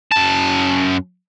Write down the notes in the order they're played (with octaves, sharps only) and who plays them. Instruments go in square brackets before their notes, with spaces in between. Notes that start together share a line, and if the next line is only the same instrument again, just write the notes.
[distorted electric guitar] F#2 A5